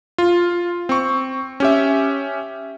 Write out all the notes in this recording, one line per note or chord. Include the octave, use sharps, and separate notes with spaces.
F4
C4 C#6
C#4 G4 E5